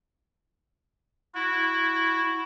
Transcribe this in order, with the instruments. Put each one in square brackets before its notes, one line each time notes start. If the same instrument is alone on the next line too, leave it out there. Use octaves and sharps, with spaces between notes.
[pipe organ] E4 [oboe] F#4